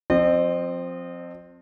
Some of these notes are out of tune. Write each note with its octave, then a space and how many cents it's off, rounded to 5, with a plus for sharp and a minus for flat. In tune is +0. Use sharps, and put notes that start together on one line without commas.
F3 +25 C4 +0 D#5 -35